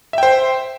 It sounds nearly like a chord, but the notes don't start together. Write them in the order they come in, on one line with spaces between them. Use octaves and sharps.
E5 G5 C5